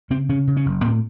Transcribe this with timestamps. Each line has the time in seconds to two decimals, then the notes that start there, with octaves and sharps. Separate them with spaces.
0.10 C#3 C4
0.29 C#3 C#4
0.47 C#3
0.57 C#4
0.66 F#1
0.84 A2 C4